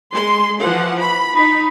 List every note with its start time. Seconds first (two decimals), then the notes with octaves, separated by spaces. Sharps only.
0.14 G#3 C6
0.61 E3 F3 F#5
1.01 B5
1.35 D#4 B5